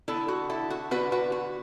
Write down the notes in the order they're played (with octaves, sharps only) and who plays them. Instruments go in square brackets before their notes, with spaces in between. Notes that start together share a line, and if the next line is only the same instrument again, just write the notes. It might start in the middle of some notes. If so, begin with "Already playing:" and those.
[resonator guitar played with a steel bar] D3 B3 D4 E4 A4
F#4
E4 A4
F#4
D3 B3 D4 F#4 B4
F#4 B4
F#4